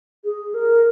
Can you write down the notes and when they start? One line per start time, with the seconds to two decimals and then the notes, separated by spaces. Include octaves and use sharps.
0.24 G#4
0.54 A#4